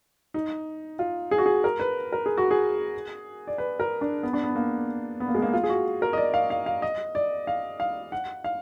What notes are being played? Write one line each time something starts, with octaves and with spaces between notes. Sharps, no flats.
D#4
F4
G#4
F#4
G#4
A#4
B4
A#4
G#4
F#4
G#4
D5
B4
A#4
D4
B3
D4
B3
A#3
B3
A#3
G#3
A#3
F4
G#4
F#4
A#4
D#5
D5
F5
F5
F5
D#5
D5
F5
F5
F#5
F5